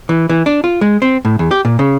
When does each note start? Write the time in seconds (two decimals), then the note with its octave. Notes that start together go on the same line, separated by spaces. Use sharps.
0.09 E3
0.29 E3
0.46 D4
0.64 F4
0.81 G#3
1.02 C4
1.25 A2
1.39 E2
1.51 G4
1.65 A#2
1.79 C#3